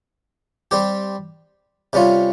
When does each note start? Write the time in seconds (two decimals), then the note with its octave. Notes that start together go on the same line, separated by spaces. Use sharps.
0.71 G3 C4 G4
1.93 C3 G3 C#4 F4